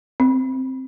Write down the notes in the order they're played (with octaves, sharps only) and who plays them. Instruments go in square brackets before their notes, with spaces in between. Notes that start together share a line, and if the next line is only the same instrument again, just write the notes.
[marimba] C4